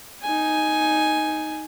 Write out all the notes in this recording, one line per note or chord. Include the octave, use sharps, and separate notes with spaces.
D#4 G#5